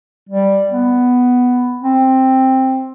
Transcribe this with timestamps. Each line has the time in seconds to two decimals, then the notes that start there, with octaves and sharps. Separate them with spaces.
0.29 G3
0.71 B3
1.81 C4